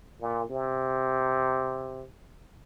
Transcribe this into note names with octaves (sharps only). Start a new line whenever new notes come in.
A#2
C3